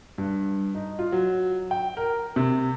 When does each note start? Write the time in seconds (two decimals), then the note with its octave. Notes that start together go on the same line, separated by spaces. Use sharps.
0.18 G2
0.75 D#4
0.99 F4
1.12 F#3
1.71 G5
1.97 A#4
2.36 C3